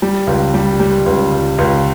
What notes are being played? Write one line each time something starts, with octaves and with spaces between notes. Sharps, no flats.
G3
C#2
G3
G3
C#2
C#2
C#2